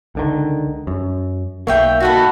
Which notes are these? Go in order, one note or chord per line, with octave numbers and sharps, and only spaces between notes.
C#2 D3 D#3
F#2
B1 A#3 C#5 E5 G5
D#4 F#4 A4 F#5 B5